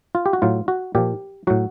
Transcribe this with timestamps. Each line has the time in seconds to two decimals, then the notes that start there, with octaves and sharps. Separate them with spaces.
0.15 F4
0.26 G4
0.33 F#4
0.42 A2 F#3 F4
0.68 F#4
0.95 A#2 F3 G4
1.47 A2 F#3 F#4